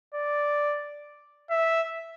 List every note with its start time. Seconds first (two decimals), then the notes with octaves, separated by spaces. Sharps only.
0.14 D5
1.50 E5